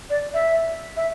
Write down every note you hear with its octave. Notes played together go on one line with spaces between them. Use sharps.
D5
E5
E5